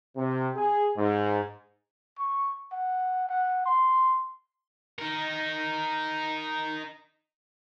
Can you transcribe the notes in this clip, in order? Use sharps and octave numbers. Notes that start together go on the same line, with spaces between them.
C3
G#4
G#2
C#6
F#5
F#5
C6
D#4 A#4